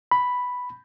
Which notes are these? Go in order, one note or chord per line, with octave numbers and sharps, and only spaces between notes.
B5